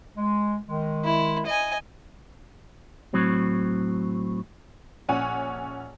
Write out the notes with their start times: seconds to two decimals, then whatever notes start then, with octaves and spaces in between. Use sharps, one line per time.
0.17 G#3
0.68 D#3 G#3
1.05 E4
1.46 D#5 G#5
3.14 A2 F#3 C4
5.09 A#1 C#4 F#5 G#5